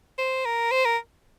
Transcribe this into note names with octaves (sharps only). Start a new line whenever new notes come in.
C5
A#4
C5
A#4